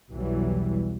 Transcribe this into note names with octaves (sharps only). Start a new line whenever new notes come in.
B1 E2 E3 F#3 G3